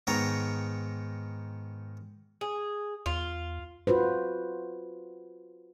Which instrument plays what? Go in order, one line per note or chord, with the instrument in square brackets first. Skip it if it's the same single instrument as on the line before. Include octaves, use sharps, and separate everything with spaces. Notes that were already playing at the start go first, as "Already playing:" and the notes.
[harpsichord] G#2 D#3 B3 C#5 G5 A#5
[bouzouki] G#4
[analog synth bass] E2 [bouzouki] F4
[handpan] F4 F#4 B4 C5